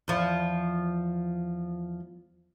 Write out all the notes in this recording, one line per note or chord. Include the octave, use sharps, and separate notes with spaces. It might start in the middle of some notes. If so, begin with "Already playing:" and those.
E2 F3